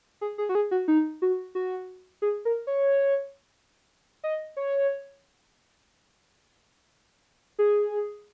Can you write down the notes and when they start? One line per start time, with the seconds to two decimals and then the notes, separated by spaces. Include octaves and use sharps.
0.21 G#4
0.38 G#4
0.49 F#4
0.55 G#4
0.71 F#4
0.88 D#4
1.22 F#4
1.55 F#4
2.22 G#4
2.45 A#4
2.67 C#5
4.24 D#5
4.57 C#5
7.59 G#4